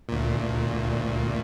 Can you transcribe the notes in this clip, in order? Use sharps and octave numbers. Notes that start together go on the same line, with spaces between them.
D2 A#2